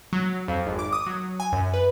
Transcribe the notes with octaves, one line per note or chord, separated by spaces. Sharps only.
F#3
F2
G#1
D6
D#6
F#3
G#5
F#2
B4